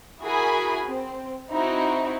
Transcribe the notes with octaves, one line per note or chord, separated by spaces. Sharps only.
E4 F#4 G#4 A#4 G#5 B5
C4
C4 D#4 E4 F#4